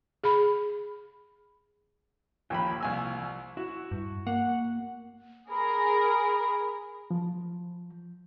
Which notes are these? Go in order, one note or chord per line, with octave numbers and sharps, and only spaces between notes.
G#4 B5
D#2 F3 A#3 F4 G5 B5
C2 G#5 E6
E4 F#4
G2
A#3 F#5
G#4 A#4 B5
F3